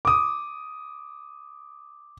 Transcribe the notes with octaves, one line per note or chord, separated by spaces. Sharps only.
D6 D#6